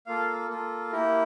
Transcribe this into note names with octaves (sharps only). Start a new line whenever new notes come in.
A#3 F4 A4 F5
A#3 F4 A4
A#3 E4 G4 A#4